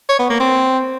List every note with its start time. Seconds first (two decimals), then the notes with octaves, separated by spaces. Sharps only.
0.09 C#5
0.19 B3
0.30 A#3
0.40 C4